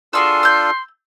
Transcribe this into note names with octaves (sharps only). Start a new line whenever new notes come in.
D4 F4 F#4 G#4 A4 C6 E6
E6 G6